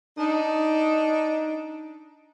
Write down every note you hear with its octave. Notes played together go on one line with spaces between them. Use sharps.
D4 D#4